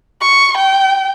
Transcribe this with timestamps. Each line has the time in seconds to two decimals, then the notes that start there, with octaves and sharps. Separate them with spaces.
0.21 C#6
0.58 G5